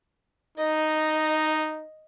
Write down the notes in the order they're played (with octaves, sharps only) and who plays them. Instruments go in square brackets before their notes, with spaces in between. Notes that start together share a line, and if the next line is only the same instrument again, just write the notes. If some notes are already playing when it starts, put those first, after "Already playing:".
[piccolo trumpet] D#4 [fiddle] D#5